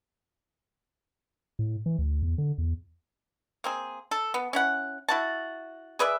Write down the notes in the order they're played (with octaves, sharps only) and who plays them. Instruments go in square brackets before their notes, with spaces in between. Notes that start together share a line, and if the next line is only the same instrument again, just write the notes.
[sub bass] A2
E3
D2
E2
D3
E2
[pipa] A#3 C4 G#4
A4
B3
C#4 E4 F#5
E4 F#4 A5
G#4 B4 D5 E5